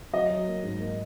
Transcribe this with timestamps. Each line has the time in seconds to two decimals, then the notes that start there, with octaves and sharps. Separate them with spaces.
0.13 F#3 D#5
0.30 F#3
0.47 A#3
0.63 G#2
0.80 A#3